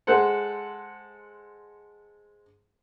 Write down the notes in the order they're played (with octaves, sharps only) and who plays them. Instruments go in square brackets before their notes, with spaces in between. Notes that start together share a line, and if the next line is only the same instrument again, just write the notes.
[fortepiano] G#3 A4 C5 F#5